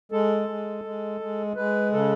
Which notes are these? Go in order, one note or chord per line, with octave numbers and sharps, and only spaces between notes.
G#3 A4
G#3
G#3
G#3
G#3 B4
C#3 A4